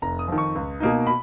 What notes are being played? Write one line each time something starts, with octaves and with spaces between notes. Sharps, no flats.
F1 A#5
D#6
F2 D#3
C#6
C#2
B2 A#3 D#4
B5